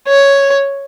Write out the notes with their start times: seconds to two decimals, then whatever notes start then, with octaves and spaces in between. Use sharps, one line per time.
0.08 C#5